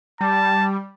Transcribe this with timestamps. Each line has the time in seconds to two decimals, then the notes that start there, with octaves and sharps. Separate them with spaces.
0.21 G3 A5